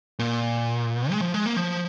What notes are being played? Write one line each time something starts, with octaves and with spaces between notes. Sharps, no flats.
A#2
G#3
F3
G#3
A#3
F3